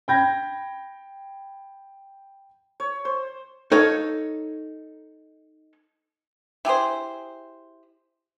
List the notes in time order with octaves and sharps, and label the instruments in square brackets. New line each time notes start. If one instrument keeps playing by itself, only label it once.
[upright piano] G5 B5 G6 G#6 A#6
[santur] C#5
C5
[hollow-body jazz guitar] D#4 A4 C#5 F5
[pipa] E4 G4 G#4 C5